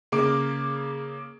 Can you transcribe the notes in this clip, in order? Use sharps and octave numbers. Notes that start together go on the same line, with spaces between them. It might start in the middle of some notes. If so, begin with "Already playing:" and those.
C#3 A#3 D6